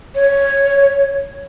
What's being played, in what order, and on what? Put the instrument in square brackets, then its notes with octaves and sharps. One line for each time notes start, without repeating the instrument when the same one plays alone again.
[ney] C#5